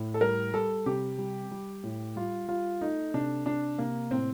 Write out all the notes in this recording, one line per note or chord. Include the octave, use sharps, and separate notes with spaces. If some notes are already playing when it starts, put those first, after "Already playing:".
Already playing: A2
A4
G3 A#4
G3 A4
C3 G4
G3
G3
A2
G3 F4
G3 F4
A3 D#4
C3 D4
C3 D4
C3 A#3
A2 C4